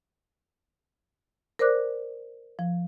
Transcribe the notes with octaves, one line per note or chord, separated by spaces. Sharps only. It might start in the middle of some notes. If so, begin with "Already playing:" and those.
A#4 C5 D5 D6 F#6
F3